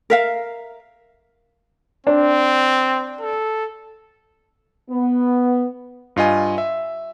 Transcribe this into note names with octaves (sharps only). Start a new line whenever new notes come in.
A#4 E5 F5
C4 D4
A4
B3
G2 F4 D#5 G#5
E5